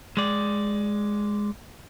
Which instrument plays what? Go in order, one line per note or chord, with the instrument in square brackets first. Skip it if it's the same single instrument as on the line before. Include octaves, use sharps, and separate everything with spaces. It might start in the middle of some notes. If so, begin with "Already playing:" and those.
[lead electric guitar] G#3 D5